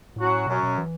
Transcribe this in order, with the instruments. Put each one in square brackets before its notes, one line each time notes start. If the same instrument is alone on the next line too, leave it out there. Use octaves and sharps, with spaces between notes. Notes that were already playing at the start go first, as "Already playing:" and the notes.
[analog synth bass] A2 [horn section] F#3 C#4 F#4
[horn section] F#2 F#3 C#4 [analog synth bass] B2
[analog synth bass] B2
E3